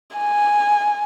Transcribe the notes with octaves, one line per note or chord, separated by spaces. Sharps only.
G#5